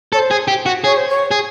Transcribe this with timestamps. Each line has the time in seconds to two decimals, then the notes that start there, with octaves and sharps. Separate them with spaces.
0.13 A4 C#5
0.17 C5
0.31 G#4
0.48 G4
0.66 F#4
0.84 G#4 C#5
0.97 C5
1.08 C#5
1.31 G#4